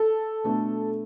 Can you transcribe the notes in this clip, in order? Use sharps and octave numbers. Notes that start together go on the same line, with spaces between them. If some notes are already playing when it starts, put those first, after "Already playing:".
Already playing: A4
B2 A3 D4